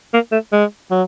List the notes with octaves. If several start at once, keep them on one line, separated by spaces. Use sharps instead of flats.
A#3
A3
G#3
F#3